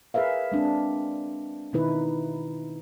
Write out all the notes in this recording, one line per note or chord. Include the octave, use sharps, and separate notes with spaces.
G#4 A#4 B4 E5 F5
G#3 C4 D4
B2 D#3 D#4 E4 B4